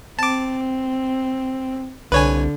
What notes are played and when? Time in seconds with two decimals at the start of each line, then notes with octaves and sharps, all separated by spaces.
0.19 C4 A5 D6
2.12 C2 D3 B4 C#5 G#5